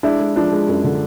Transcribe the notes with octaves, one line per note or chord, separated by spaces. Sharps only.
G#3 D4 E4
G#3
F3 D4
G#3
F#2
D3